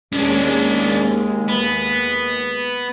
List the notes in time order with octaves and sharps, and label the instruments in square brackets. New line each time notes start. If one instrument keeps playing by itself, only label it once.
[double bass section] D#2 G#3 [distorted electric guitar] C#4 D4
[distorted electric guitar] B3